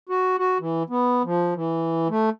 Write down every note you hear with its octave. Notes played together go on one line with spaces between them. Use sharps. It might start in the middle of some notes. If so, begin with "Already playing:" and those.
F#4
F#4
E3
B3
F3
E3
A3